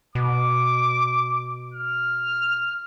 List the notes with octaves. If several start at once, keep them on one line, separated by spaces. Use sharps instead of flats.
B2 D6
F6